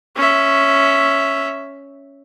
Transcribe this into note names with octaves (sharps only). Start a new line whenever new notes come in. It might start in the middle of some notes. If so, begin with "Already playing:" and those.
C#4 E5